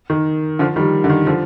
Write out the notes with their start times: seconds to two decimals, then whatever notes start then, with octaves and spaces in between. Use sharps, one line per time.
0.10 D#3
0.59 D3 F3
0.76 D#3 G3
1.04 D3
1.10 D#3
1.27 D3 F3